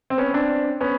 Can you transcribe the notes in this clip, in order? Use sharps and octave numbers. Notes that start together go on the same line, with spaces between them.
C4
B3 C#4
C4 D4
B3 C#4